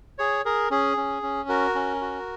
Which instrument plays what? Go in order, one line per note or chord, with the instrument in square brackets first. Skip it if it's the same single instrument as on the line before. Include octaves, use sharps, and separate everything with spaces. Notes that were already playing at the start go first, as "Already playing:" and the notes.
[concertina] G#4 C#5
G#4 A#4
C#4 G#4
C#4
C#4
F#4 A#4
C#4
F#4